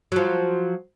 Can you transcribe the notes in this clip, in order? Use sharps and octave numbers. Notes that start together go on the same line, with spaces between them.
F3 F#3